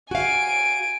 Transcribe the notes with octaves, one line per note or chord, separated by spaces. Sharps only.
F#4 F5 G#5 D7